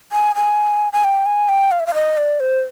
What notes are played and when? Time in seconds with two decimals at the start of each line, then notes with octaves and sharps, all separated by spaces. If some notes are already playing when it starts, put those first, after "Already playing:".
0.12 G#5
0.36 G#5
0.93 G#5
1.04 G5
1.26 G#5
1.49 G5
1.71 F5
1.80 E5
1.87 F5
1.94 D#5
2.17 D5
2.40 C5